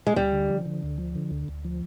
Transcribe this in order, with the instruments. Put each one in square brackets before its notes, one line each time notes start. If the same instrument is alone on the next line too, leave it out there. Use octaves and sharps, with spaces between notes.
[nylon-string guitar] G#3
[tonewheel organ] D2 [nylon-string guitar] G3
[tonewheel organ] D3
F3
D3
D2
F3
D3
D2
D2
F3